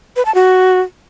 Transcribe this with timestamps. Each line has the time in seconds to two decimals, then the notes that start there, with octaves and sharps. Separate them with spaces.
0.16 B4
0.25 A5
0.35 F#4